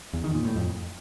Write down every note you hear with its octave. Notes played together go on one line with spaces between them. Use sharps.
E2
D#3
A#2
A2
F2